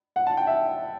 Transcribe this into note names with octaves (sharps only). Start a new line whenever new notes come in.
F#5
A5
G5
E5